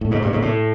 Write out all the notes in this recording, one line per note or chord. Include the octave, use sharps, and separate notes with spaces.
A2
G#2
G2
G#2
A2